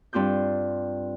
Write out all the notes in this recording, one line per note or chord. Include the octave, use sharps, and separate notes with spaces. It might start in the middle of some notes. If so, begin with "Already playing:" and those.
G2 C4 F4 D6 G6